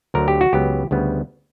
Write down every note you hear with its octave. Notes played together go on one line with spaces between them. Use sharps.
D2 D3 F#3 A#4
G4
F#4
C#2 C#3 F#3 B3 G4
D2 C#3 G3 B3